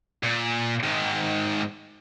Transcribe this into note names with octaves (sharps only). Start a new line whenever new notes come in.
A#2
G#2 D#3